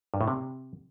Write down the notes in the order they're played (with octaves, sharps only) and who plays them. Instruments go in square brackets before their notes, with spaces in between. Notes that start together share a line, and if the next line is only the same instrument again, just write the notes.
[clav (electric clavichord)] G2
A2
C3